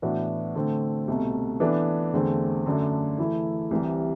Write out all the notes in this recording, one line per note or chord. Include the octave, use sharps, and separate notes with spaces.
A2 E3 B3 D4 F#4
D3 A3 C4
C2 B2 A3
E3 B3 D4 A4
E2 D3 A3 C4
F#2 D3 A3 D4
E3 A3 E4
C2 C3 E3 G3